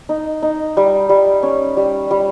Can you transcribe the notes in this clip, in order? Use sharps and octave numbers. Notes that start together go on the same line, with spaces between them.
D#4
D#4
G3
G3
C#4
G3
G3